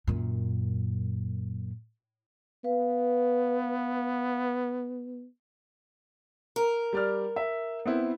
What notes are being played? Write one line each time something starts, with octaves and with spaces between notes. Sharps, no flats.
F#2 A#2
B3 B4 F5
A#4
G3 D5 F6
E5
B3 C4 E4